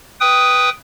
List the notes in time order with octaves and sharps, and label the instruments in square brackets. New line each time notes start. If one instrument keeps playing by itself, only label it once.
[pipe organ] B4 G5 D#6